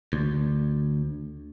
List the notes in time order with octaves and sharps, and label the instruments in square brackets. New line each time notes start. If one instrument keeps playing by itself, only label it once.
[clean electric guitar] D2